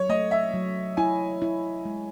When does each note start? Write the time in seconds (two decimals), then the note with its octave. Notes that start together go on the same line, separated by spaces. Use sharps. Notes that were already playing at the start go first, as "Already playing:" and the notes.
Already playing: F#3 C#5
0.09 A3 D#5
0.31 E5
0.53 F#3
0.97 E4 G#5
1.42 E4
1.85 G#3